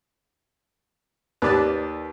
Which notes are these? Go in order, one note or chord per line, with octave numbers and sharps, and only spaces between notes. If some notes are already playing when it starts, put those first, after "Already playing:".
D#2 B4 D5 A5